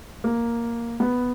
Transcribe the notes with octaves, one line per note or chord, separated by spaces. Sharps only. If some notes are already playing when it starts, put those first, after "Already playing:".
A#3
B3